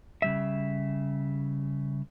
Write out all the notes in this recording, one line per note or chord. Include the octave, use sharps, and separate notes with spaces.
C#3 G3 E5